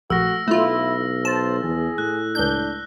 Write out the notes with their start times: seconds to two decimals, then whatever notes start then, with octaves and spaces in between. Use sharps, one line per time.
0.10 A#1 A3 F#4 E6 F6 A#6
0.48 B1 A3 E4 F4
1.25 C5 A5
1.63 E2 G#4
1.98 A2 F#6
2.35 C#2 D4 G6